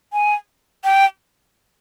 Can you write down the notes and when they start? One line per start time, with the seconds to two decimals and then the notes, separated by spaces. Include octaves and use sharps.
0.13 G#5
0.84 G5